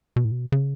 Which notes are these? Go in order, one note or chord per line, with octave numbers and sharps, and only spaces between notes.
B2
A2
B2
C#3